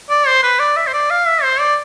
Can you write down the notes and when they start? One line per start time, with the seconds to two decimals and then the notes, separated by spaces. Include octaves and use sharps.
0.10 D5
0.27 C5
0.43 B4
0.59 D5
0.76 E5
0.87 C5
0.93 D5
1.10 F5
1.27 E5
1.43 C5
1.60 D5